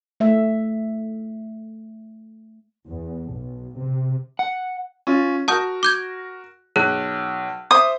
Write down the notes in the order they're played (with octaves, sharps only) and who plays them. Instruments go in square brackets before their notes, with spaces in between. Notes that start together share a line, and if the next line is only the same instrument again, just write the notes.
[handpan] A3 E5
[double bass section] E2
B1
C3
[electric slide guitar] F#5
[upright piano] C#4 F4
[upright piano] F#4 A#4 [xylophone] A5 D#6 G6
[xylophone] D6 G6 G#6
[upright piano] B1 F#6 [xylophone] G#4
[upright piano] C5 E5 [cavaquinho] D#6